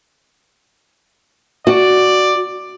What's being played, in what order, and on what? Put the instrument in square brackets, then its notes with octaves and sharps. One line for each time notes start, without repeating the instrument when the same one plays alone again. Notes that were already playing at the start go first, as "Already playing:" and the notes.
[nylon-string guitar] F#4 [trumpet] D5